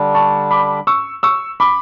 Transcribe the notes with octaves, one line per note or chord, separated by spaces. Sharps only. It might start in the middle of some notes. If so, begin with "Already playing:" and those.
Already playing: D3 G3 D4
A5 C#6
B5 D6
C#6 E6
C#6 E6
B5 D6